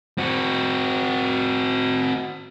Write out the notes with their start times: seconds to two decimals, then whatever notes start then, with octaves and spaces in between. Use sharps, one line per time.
0.18 C4 F#4